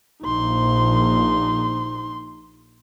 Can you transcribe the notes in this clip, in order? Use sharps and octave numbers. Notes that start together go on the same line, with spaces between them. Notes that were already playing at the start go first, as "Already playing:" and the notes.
A#1 D#4 C6